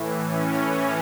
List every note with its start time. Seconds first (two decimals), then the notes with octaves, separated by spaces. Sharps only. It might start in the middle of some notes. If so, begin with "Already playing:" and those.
Already playing: A2 E3
0.24 A2 E3 C#4